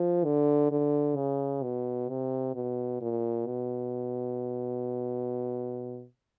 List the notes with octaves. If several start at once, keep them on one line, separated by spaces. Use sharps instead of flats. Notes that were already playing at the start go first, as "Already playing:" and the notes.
Already playing: F3
D3
D3
C#3
B2
C3
B2
A#2
B2